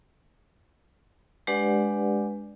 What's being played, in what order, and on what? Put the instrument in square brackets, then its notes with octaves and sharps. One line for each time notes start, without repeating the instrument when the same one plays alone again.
[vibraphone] G#3 D4 G4 B4 D5 F#5